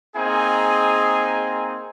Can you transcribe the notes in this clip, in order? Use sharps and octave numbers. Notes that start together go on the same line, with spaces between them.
A#3 C4 D#4 G#4 G#5